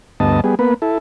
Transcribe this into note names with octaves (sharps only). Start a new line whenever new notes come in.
D2 G2 B3 D#5 A5
G3 B3 G#4
A#3 B3 B4
E4 A4